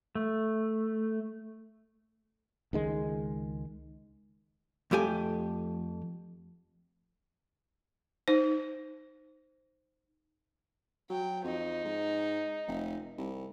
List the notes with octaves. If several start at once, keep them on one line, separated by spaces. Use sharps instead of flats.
A3
C#2 D#3 G#3
F2 A3 G4 G#5
D#4 C5
F#3 G5
F2 D#4
G#2
F1
C2